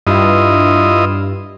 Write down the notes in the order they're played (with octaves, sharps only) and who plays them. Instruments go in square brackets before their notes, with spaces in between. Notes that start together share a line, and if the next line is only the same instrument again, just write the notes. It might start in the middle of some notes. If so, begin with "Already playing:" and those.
[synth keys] G2 [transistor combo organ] E4 F4 D#5